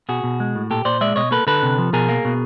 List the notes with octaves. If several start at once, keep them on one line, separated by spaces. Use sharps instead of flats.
B2 F#4 G#4
B2
G#3
A2
A#2 G4 A4
A#2 C5 D5
G#3 D5 E5
B2 C#5 D#5
A#3 A4 B4
D3 A4 B4
C3
F3
B2 G#4 A#4
A#3
B2